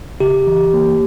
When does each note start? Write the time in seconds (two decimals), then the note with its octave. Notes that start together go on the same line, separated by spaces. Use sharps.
0.20 C#3 G4
0.47 E3
0.74 A#3